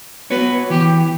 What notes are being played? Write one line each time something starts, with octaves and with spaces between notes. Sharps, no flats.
B3 F#4 B4 C#5
E3 G4